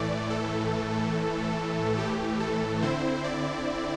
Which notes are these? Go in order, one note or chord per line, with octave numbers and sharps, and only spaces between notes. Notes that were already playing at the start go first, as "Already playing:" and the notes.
Already playing: A2 E3 A3 D5
A4
G4
A4
D3 C4 E4 C5
D5